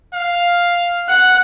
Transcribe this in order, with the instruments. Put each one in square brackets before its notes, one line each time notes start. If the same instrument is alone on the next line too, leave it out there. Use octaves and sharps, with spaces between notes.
[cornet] F5
[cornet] F#5 [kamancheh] F#6